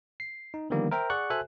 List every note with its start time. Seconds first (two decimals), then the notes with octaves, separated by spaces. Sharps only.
0.20 C7
0.54 D#4
0.70 D3 D#3 F3 G3 A#3 B3
0.91 A#4 C5 E5 G5 A#5
1.10 G#4 D5 F#5 C#6 F#6
1.30 F#4 A4 C5 E5 G#5 F#6